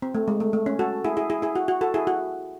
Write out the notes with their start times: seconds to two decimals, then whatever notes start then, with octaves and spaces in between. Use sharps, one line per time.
0.02 C4
0.15 A3
0.28 G#3
0.40 A3
0.53 A3
0.66 C#4
0.79 F#4 A4
1.05 E4 G#4
1.17 E4 G#4
1.30 E4 G#4
1.42 E4 G#4
1.56 F#4
1.68 F#4
1.81 F#4 A4
1.94 E4 G#4
2.07 F#4